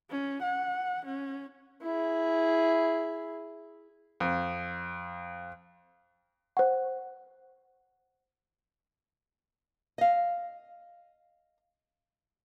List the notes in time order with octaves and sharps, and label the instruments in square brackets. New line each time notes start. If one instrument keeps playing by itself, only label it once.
[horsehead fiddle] C#4
F#5
C#4
[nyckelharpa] E4 G#4
[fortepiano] F2
[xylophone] C5 F#5
[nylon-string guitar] D#5 F5